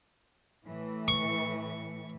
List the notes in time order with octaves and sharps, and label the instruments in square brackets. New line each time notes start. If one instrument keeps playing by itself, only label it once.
[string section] A2 E3
[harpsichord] C#6